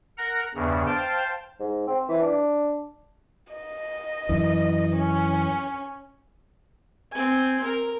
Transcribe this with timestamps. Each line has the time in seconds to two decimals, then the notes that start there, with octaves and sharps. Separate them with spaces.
0.18 A#4 F#5 A#5
0.55 E2 G2 C#3
0.87 C5 F5 G5 A5
1.60 G#2
1.87 C4
2.09 E3
2.21 D4
3.53 D#5
4.29 F#2 E3
4.96 C#4
7.12 C4 G#5
7.64 A#4